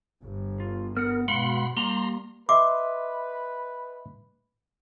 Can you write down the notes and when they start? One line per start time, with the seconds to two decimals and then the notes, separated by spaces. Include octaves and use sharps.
0.23 G1
0.60 F4
0.97 B3 A#4 F#5
1.28 B2 G#3 F5 F#5 B5 C6
1.77 G3 A#3 A#5 C6
2.49 B4 D#5 E5 C6 D6